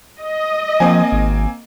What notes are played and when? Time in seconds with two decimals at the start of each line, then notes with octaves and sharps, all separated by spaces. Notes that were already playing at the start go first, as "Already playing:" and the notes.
0.20 D#5
0.80 F3 A#3 C4 G#5
1.12 G#1